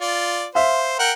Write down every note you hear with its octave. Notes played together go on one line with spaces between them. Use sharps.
F4 D5
C5 E5 F5
A#4 F#5 G5